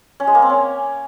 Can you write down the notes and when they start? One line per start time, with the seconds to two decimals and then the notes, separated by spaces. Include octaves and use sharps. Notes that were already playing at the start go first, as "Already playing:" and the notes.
0.20 C#4
0.27 G#3
0.35 A#3
0.42 C4
0.49 C#4